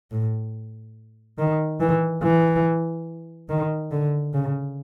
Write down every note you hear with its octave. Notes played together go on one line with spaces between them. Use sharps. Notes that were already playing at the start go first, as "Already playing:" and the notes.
A2
D#3
E3
E3
D#3
D3
C#3